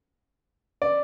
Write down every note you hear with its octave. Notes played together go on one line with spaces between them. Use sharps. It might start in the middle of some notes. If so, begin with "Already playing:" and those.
D5